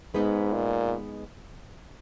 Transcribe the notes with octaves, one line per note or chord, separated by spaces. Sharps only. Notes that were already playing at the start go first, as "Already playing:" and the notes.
G#2 G#3 B3 D#4 G#4 B4
A#2